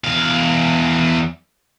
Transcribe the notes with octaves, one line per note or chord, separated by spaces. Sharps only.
E2 F5